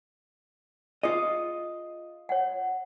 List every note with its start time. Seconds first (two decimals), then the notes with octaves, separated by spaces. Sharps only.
1.03 F4 G#4 D#5 D#6
2.29 C#5 F#5